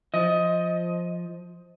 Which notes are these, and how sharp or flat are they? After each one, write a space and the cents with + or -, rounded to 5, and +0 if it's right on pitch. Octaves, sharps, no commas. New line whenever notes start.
F3 +0 D#5 +15